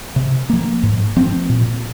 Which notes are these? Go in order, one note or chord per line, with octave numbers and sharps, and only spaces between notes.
C3
F3 A#3
G#2
F3 C4
A#2